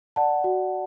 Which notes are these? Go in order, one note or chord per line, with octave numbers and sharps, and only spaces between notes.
D5 F#5 A5
F#4